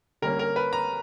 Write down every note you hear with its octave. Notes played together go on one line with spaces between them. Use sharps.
D3 G3 A#3 C#4 A#4
A#4
B4
A#5